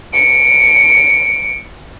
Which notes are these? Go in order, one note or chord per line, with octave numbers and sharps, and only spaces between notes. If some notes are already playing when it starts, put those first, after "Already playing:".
C#7 D7